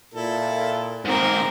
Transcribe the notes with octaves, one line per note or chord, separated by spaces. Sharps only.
A#2 E4 A4
G#2 D#3 A#3 C4 A#4